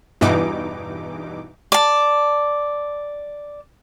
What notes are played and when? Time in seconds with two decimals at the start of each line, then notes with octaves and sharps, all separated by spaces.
0.21 E2 G2 B2 E3 D#4 D6
1.72 D5 A5